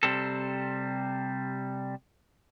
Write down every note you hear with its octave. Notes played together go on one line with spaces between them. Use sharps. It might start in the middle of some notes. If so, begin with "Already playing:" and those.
C3 G3 C4 A4